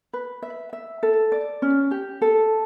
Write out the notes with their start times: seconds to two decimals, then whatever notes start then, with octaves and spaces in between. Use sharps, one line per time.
0.13 B4
0.42 E5
0.73 E5
1.03 A4
1.32 D5
1.62 C#4
1.91 G4
2.22 A4